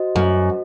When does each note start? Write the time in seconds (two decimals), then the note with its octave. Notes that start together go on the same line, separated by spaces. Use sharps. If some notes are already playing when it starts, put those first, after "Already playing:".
Already playing: F#4 C5 D#5
0.16 F#2